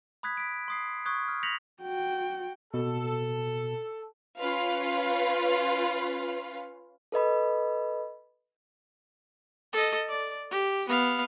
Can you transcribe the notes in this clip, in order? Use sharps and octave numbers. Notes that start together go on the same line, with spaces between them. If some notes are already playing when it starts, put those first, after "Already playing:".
B5 D#6 F#6 G#6 B6
B6 D7
C6 D#6 C7
C#6 D#6 F#6 G#6
F6
G6 A#6 B6 C#7 F7 F#7
F#4 G5
B2 A4
C#4 F4 B4 F5
A4 B4 D#5 B5
A4 D#5
D5
G4
B3 F5